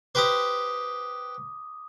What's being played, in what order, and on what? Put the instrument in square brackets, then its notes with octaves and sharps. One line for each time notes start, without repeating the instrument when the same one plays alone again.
[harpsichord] G4 B4 C5 [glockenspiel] D6 D#6